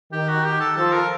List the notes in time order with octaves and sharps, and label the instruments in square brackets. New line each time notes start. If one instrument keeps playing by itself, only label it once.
[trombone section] D#3 [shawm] G4
[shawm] F#4
G4
A4
[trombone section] F3 [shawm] A4
[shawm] A#4